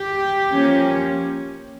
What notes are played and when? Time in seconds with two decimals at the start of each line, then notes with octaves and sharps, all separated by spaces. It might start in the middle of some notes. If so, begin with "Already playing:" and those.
Already playing: G4
0.51 F3 A#3 C#4